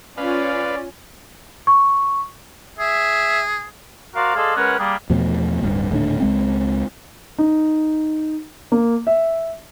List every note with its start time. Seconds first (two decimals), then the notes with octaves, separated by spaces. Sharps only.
0.18 C#4 F4 B4 D5 F5
1.67 C#6
2.79 G#4 E5
4.15 F#4 A#4 C5 D5 F5
4.36 G#4 A4 C5 D5 D#5 F5
4.56 G#3 C#4 A#4 B4 F#5
4.79 G3 A#3 G#4
5.10 E2 B2 F3 A3
5.63 D1 G2
5.91 D#1 A2 D3 D4
6.20 C#2 G#3 C4
7.38 D#4
8.72 A#3
9.07 E5